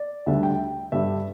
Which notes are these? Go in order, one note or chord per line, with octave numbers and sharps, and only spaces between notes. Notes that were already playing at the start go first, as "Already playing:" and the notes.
Already playing: D5
D2 D3 G3 E5
G5
G2 D3 G3 E5